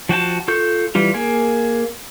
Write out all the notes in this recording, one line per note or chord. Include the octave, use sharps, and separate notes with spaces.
F3 F#4 G5 A5
F4 A4 C#6 G6
E3 G3 F4
A#3 G#4